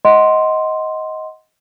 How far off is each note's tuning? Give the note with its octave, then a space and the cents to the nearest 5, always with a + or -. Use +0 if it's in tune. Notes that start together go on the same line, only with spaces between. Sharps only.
D#5 +15 F#5 +0 C6 +0